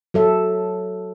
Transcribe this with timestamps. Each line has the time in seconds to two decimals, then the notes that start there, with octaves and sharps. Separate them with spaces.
0.14 F#3 A4 E5